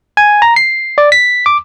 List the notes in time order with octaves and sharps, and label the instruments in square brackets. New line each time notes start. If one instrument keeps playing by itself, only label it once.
[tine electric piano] G#5
A#5
C7
D5
B6
D6